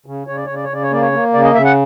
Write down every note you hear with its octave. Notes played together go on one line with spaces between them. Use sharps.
C#3
C#3 C#5
D5
C#3 C#5
D5
C#5
C#3 D5
C#5
A#3 D5
C#5
A#3
C#3 D5
D#5
C#3 E5
F#5